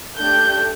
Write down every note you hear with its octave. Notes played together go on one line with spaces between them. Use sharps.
A3 D4 G4 G6